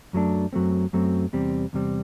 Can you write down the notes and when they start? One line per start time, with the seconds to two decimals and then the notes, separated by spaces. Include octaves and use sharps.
0.13 F#2 F#3 A3 D4
0.53 F#2 F#3 A3 C4
0.93 F#2 F#3 A3 C4
1.33 E2 C3 G3 C4
1.73 E2 C3 G3 C4